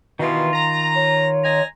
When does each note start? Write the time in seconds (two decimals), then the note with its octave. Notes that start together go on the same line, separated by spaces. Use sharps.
0.19 B2 D#3 E3 F4
0.53 A#5
0.95 C#5
1.43 D#5 G#5 A#5